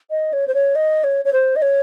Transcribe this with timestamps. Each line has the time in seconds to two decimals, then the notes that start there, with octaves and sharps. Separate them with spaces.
0.10 D#5
0.33 C#5
0.47 C5
0.54 C#5
0.75 D#5
1.03 C#5
1.25 C#5
1.32 C5
1.56 D#5
1.62 C#5